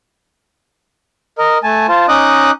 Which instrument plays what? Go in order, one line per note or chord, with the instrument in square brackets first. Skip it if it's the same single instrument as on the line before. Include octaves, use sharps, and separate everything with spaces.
[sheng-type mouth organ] A#4 D#5
A3 G#5 A5
F4 C5 A5
C#4 D#4 D#5 D6 D#6 F#6